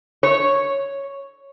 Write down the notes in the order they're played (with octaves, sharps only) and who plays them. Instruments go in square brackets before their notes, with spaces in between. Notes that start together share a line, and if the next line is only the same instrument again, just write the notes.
[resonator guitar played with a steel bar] C#5